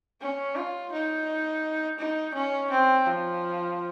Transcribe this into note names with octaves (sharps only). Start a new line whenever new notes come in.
C#4
F4
D#4
D#4
C#4
C4
F3